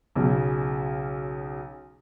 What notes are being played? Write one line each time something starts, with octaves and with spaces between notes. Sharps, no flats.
B1 C#3 F#3